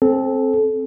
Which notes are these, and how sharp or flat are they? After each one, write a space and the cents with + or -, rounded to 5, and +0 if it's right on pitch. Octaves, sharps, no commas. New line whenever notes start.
C4 +15 A4 -20